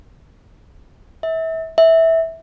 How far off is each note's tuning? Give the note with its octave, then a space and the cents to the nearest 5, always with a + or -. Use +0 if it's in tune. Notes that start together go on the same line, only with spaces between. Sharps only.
E5 -30
E5 -15